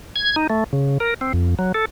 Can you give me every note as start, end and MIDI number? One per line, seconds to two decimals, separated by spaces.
0.16 0.36 92
0.36 0.47 63
0.50 0.64 57
0.73 0.98 49
1.00 1.14 70
1.21 1.32 60
1.33 1.55 41
1.59 1.72 54
1.74 1.85 69